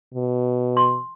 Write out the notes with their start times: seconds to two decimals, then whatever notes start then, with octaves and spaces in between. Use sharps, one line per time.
0.15 B2
0.77 C6